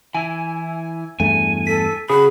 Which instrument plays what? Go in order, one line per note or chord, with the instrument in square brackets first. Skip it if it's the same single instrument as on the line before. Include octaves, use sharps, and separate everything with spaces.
[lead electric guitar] E3 E4 [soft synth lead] G#5
[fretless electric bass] E2 G2 A3 [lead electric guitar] G#5
[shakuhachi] A4 [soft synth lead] B6
[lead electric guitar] C#3 F#4 [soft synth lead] G#4 [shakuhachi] B5